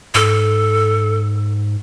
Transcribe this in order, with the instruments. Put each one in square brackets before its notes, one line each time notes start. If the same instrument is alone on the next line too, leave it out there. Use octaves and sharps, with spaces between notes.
[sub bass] G#2 [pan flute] A4